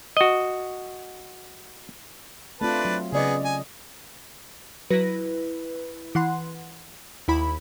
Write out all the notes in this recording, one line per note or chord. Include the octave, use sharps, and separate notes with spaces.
F#4 D#5
A3 C4 D4 F4 B4 A5
F#3
C#3 B3 G#4 D5 D#5
G#5
F#3 E4 B4 A#6
E3 F#5 C6
D#2 E4 B5